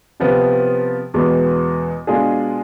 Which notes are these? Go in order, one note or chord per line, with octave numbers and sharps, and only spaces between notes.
C3 F3 B3
E2 B2 G#3 B3
B2 G#3 D4 F4 G#4